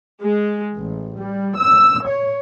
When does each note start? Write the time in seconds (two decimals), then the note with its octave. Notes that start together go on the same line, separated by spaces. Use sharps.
0.21 G#3
0.76 A1
1.17 G3
1.57 E6
2.07 C#5